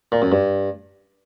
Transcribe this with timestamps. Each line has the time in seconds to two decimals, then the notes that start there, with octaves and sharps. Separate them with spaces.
0.12 A#2
0.22 F#2
0.32 G2